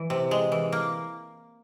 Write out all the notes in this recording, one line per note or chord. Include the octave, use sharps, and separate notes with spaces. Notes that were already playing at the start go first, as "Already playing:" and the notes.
Already playing: E3
C3
G#3
E3
A#3